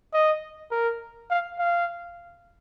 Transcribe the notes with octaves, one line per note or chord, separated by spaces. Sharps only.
D#5
A#4
F5
F5